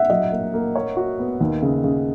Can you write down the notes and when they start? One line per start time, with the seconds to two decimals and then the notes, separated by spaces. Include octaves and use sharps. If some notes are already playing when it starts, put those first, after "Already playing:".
Already playing: E5 F#5
0.10 F#3 D#5
0.32 A#3
0.54 A#3
0.76 C#5
0.97 F#4
1.19 B3
1.41 D#2
1.62 C#3
1.84 C#3